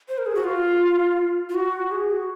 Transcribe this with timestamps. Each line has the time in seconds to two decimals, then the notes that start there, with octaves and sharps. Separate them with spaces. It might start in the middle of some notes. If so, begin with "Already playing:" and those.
0.09 C5
0.18 A#4
0.26 G#4
0.35 F#4
0.44 F4
1.49 F4
1.55 F#4
1.91 G#4
2.10 F#4